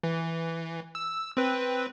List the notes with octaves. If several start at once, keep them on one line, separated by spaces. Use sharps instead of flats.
E3
E6
C4 B4